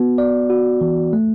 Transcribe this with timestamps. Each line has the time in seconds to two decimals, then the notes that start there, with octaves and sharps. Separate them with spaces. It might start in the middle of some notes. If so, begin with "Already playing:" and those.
Already playing: B3 F#4
0.18 D5
0.50 F#4
0.81 E3
1.13 A3